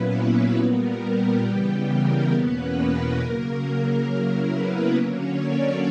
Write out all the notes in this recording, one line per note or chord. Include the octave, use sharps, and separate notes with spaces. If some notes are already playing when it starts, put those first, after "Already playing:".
Already playing: A#2 F#3 A#3 B3 C#4 E4 B4
B3 B4
A#2 G3 B3 A#4
G4
C#3 E3 G3 B3
A#4
E2 B2 A#3 B3 C#4 B4
A#4
C#3 F#3 A#3 A#4
C#3 F#3 A#3 E4
B3 B4
D3 F#3 A#3 C#4 C#5
D4 D5